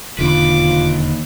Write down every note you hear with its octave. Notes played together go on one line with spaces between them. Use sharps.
E1 D#2 D3 F4 B4 D6